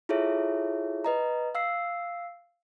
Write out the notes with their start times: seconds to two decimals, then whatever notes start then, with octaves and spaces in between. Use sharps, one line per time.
0.09 E4 F4 G#4 A4 C#5 E5
1.04 B4 D#5 A#5
1.55 F5 E6 C7